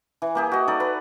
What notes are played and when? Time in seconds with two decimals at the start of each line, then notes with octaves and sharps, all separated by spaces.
0.22 E3
0.35 A#3 G4 G#4
0.52 F#4 D#5
0.68 D#4 A4 D5
0.80 B4